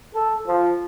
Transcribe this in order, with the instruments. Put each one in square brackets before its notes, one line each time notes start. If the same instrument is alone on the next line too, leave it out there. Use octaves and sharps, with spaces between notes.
[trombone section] A4
F3